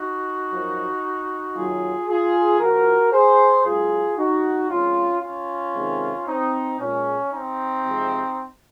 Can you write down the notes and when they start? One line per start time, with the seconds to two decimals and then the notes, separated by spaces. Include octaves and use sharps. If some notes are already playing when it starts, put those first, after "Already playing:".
Already playing: D#4 F#4
0.51 F#2 F3 A#3
1.55 F#2 D#3 F#3 A#3 F4 G#4
2.08 F4 G#4
2.60 A#2 F3 A#3 F#4 A#4
3.12 G#4 C5
3.65 F#2 C#3 G#3 F4 G#4
4.17 D#4 F#4
4.70 C3 F3 G#3 C#4 F4
5.22 C#4 F4
5.74 C3 D#3 G#3
6.26 C4 D#4
6.79 A#2 G#3 C#4
7.32 C4 D#4
7.84 C3 F3 G#3